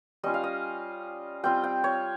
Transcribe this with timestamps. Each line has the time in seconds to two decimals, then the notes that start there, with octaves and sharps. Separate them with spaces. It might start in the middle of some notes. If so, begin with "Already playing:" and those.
0.23 G3 C#4 F4 D#5
0.34 F5
0.44 D#5
1.43 G3 C4 F4 G5
1.64 G5
1.84 C#5